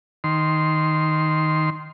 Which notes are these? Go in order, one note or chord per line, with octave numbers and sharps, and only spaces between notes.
D#3 C6